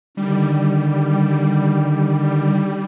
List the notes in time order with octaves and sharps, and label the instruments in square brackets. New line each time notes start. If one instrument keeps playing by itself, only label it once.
[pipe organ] D3 D#3 [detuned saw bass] G3